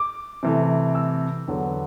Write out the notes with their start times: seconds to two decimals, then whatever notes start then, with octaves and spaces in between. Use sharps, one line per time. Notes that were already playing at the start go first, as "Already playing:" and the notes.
Already playing: D6
0.43 C3 E3 A3
0.95 E6
1.47 E2 D3 F#3 B3